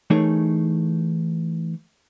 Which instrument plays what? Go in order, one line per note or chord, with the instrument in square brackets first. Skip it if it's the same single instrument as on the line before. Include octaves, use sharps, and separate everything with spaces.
[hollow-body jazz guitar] E3 A3 D#4 G#4 A#4 C#5